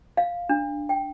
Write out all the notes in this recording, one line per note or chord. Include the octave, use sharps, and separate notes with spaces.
F5
D4
G5